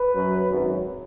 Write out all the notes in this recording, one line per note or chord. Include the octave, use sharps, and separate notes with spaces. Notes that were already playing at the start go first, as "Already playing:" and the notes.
Already playing: B4
F#2 F#3
G#1 F#2 F#3